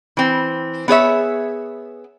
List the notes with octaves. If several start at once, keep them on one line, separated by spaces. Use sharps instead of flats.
E3 C4
B3 G#4 C#5 E5